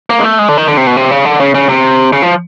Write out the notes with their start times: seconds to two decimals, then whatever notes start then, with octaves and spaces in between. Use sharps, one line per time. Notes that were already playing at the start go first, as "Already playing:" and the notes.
0.10 A#3
0.20 G#3
0.24 A3
0.39 G#3
0.49 D3
0.57 D#3
0.68 D3
0.77 C3
0.87 B2
0.97 C3
1.11 C#3
1.25 D3
1.40 C#3
1.55 C#3
1.69 C3
2.13 C#3
2.22 F3